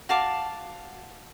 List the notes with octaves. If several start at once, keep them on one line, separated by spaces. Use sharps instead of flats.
F#4 F5 A5 D6